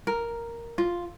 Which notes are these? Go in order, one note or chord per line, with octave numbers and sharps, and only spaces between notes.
A#4
F4